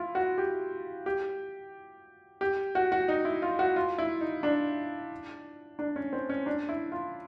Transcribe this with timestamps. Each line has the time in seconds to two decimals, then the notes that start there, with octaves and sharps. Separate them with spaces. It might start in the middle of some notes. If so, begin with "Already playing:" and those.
Already playing: E4 F4
0.15 F#4
0.38 G4
1.06 G4
2.41 G4
2.75 F#4
2.92 F#4
3.08 D#4
3.25 E4
3.42 F4
3.59 F#4
3.76 F4
3.98 E4
4.21 D#4
4.43 D4
5.79 D4
5.96 C#4
6.13 C4
6.30 C#4
6.46 D4
6.69 E4
6.92 F4